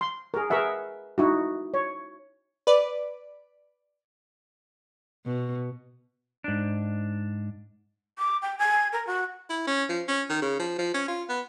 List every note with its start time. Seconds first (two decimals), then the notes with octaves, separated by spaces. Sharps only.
0.01 C6
0.34 G#4 A#4
0.50 G#4 A#4 B4 E5 F#5
1.18 D#4 E4 F#4
1.74 C#5
2.67 B4 D5
5.26 B2
6.44 G#2 D4
8.18 D6
8.42 G5
8.59 G#5
8.93 A#4
9.07 F#4
9.50 E4
9.67 C#4
9.89 F3
10.08 C#4
10.30 D#3
10.42 C#3
10.59 F3
10.78 F3
10.94 C#4
11.08 F4
11.29 B3